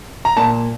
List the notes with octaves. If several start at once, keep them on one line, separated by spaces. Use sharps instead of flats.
A#5
A#2 A5